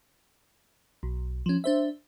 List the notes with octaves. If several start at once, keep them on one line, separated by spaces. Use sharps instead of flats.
B1
F3 C#4
D4 C5 E5